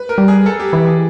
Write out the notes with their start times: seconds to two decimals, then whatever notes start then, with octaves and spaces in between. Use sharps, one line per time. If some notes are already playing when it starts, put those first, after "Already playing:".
Already playing: B4
0.09 A#4
0.18 G3
0.28 G#4
0.46 A4
0.60 G4
0.73 E3 G4
0.86 G#4